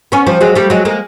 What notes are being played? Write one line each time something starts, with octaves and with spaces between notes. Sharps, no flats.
B3 C#4
F3 G3
F#3 G#3
G3 A3
F#3 G#3
G#3 A#3